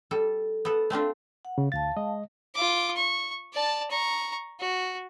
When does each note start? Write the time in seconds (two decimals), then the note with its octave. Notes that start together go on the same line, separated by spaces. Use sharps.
0.11 G3 A4
0.65 B3 A4
0.90 A3 C4 D4 F4
1.45 F#5
1.58 C#3
1.72 D2 F5 A5 A6
1.97 G#3 D#5
2.55 F4 D6
2.97 C#6
3.53 D5 A5
3.90 A#5 C#6
4.60 F#4